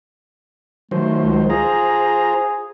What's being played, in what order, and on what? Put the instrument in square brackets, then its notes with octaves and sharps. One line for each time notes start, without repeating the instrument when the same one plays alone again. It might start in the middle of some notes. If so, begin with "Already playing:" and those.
[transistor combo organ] D#3 F#3 C5 [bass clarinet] A3
[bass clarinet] C#2
[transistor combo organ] F4 C5 A#5 [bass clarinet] G#4